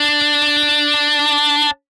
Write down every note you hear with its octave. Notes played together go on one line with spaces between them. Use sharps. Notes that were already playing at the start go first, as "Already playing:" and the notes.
Already playing: D4